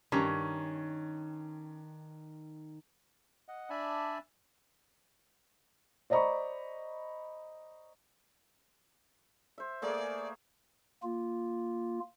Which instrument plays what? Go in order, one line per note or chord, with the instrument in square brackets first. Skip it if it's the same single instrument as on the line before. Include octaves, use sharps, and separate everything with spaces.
[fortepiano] G2 [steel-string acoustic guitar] D#3 [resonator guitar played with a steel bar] C#4 A#5
[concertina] D#5 F#5
D4 D5 E5 G#5 A5 B5
[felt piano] C5 D5 D#5 A#5 B5 C#6
[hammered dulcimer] C5 E5
[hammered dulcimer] A3 A#3 G#4 [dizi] D5
[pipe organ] A#3 F4